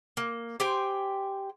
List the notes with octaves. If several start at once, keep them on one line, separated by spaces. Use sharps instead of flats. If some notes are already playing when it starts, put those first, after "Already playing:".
A#3
G4 C5 G5 G#5